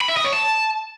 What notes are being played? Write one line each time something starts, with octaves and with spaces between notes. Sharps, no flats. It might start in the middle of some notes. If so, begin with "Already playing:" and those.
B5
E5
D#5
C#5
A5